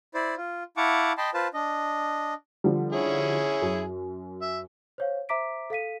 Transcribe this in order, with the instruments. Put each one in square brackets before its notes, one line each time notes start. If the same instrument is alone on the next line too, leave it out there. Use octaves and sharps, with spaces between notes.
[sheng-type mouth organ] E4 C5 D5
F4
E4 F5 F#5 A5 C#6 D6
D#5 G5 A5 B5 C6
F4 B4 C5 A5
D4 D#5
[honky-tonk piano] D3 F3 G3
[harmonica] C#4 E4 G#4
[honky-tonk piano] F#2
[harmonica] E5
[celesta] C5 C#5 F5
C5 E5 A#5 D6 B6 D7
A4 F5 B6 D#7